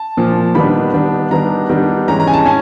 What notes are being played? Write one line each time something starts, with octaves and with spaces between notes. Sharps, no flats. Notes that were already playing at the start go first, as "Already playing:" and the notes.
Already playing: A5
A#2 F3 A#3
D#3 G3 B3 D4 B5
D#3 G3 B3 D4
D#3 G3 B3 D4 A#5
D#3 G3 B3 D4
E3 G#3 C#4 A#5
A#5
G#5
A5
C#4 G#5